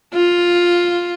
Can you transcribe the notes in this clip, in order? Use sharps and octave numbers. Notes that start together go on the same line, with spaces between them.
F4